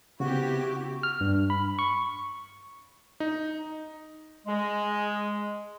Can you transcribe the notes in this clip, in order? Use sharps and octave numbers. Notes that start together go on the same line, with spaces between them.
C#3 B3 C4 E4 F#4 G4
F6
G2
B5
C#6
D#4
G#3